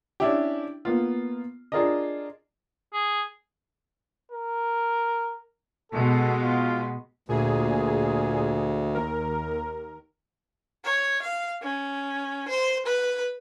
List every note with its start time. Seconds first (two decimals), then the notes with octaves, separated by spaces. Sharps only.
0.20 C#4 D4 E4 G4
0.85 A#3 B3 F4
1.72 D4 F4 G#4 A#4 D5 D#5
2.93 G#4
4.32 A#4
5.92 B2 G#3 A4
6.43 F4
7.29 D2 A#2 G#4
8.94 D#2 A#4
10.85 C#5
11.22 F5
11.62 C#4
12.48 C5
12.86 B4